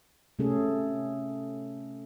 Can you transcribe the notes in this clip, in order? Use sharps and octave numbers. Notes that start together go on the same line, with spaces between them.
C3 A3 C#4 G#4 A4